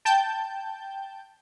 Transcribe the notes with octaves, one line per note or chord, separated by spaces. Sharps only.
G5 A5 G6